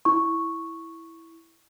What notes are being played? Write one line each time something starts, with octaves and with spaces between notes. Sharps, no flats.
E4 C#6